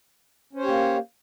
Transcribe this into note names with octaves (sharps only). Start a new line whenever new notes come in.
A#3 C#4 G4 C5 C#5